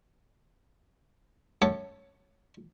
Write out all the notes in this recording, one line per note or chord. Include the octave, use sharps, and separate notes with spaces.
F#2 A4 C#5 F#5